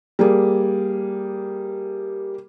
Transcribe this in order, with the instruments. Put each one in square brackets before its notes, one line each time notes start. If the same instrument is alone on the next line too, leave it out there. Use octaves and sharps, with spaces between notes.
[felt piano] G3 A#3 G#4